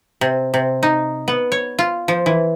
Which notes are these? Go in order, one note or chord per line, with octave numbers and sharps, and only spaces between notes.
C3
C3
D#4
B3
C#5
F4
F3
E3